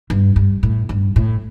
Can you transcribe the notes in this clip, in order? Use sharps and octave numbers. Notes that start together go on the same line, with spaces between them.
G2
G2
A2
G2
A2